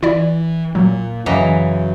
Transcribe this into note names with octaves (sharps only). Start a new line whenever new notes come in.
E3 E4 D5
A#2 F#3
F#2 C#3 E3 F#3 D#5